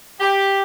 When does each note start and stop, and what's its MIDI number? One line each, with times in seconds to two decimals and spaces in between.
0.20 0.62 67